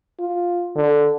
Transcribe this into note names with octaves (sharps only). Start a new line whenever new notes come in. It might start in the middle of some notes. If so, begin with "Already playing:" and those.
F4
D3